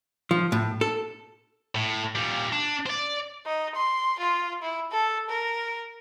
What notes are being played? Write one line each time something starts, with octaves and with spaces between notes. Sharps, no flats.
F3
A2
A4
A2
A#2 G3
D4
C5 D5
D#4
C6
F4
E4
A4
A#4